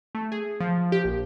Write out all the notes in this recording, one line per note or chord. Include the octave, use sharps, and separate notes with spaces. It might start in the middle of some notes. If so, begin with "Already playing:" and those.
A3
G#4
F3
G4
A#1